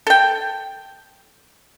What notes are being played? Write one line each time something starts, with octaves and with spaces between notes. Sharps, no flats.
A4 G5